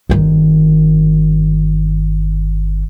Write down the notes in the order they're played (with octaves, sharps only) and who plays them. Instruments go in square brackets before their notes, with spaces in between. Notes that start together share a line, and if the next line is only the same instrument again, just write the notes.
[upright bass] G1 D#3